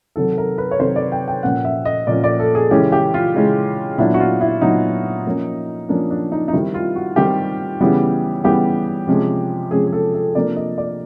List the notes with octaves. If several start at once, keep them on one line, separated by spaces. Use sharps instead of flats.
C3 D#3 F#3 A4
A#4
B4
C#5
C3 D#3 F#3 C5
D5
G5
G5
A#2 F3 A#3 C#4 F#5
E5
D#5
A#2 F3 A#3 C#4 D5
D5
A4
G#4
C#3 E3 G#3 C#4 G4
G4
F4
C#3 E3 G#3 C#4
A#2 F#3 B3 D4 E4
F#4
F4
E4
A#2 F#3 B3 D4 D#4
F3 A#3 C#4
F3 A#3 C#4 D4
D4
D#4
D#4
D#3 G3 C4 E4
F4
F#4
D#3 G3 C4 G4
C#3 E3 G3 B3
C#3 E3 G3 B3 G4
C3 F3 G#3 C#4
C3 F3 G#3 C#4 G#4
G#4
A4
A4
C3 F3 A#3 D4 D5
D#5
D5